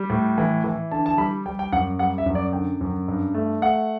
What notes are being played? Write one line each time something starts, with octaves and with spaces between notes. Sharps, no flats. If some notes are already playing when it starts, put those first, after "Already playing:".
Already playing: G3
A2
E3
E3
D3 A5
A5
G3 B5
G3 G5
G5
F#2 F#5
G3 F#5
E5
F#2
D5
D3 G5
F#2
G2
A3
A3 F#5